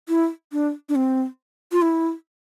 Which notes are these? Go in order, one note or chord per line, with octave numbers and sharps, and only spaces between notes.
E4
D4
D4
C4
F4
E4